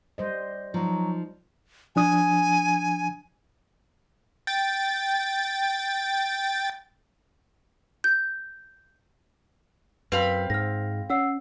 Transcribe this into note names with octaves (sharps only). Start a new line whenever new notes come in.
G3 C5 D#5
F3 F#3 D#4
F3 D4 G#5 D#6
G5 A6
G6
F#2 C4 B4 F5 B5
G#2 F6 A#6
C#4 F#5 E6 C7